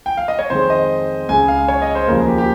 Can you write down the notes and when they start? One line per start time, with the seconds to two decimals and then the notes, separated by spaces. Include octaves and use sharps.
0.06 G5
0.17 F5
0.28 D#5
0.39 C#5
0.50 F2 D#3 G#3 C5
0.70 D#5
1.29 C#2 C#3 G#3 G#5
1.48 F5
1.68 C#5
1.82 D#5
1.95 C5
2.08 D#2 C#3 F3 A#4
2.27 G4
2.38 G4